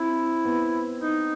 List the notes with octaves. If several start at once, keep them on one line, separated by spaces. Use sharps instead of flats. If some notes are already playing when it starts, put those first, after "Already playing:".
Already playing: C4 E4
B3
D#4